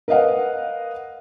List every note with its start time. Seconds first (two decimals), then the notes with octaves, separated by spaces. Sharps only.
0.08 A#4 B4 D#5 F5 F#5